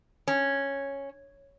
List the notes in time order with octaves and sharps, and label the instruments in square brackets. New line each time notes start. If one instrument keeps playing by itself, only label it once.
[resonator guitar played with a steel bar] C#4